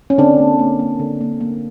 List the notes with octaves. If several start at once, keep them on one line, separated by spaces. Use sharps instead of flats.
C#4
D3 C4 D4
A#3
A#3
A#3
D3
A#3
A#3